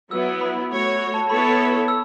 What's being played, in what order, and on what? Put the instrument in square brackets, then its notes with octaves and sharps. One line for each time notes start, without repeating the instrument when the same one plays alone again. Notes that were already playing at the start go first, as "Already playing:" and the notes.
[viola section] F#3 B3 E4 [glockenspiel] E6
[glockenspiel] E6
B5
[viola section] A3 F#4 C#5
[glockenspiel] C#6
A5
[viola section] B3 E4 A4 C#5 [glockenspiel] B5
[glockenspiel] E6